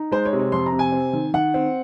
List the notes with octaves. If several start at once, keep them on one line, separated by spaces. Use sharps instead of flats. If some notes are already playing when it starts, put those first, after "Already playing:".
Already playing: D#4
G#3 C5
C#5
C3
C#5
F2 C6
A#5
C3
G#5
C4
D#3
D#3 F#5
C4